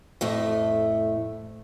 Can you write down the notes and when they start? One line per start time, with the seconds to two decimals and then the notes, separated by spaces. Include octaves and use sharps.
0.21 F2 A2 A3